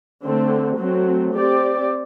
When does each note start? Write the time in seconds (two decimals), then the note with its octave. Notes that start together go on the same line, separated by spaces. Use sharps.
0.24 D3 A3 C4
0.81 F#3 A3 C4
1.37 C4 G4 D5